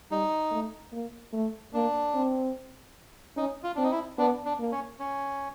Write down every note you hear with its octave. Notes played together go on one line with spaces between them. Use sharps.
G3 D#4
A3
A#3
A3
A#3 D4
C4
C#4 D#4
F4
C4 D4
D#4
E4
B3 D4
D4
A#3
C#4
C#4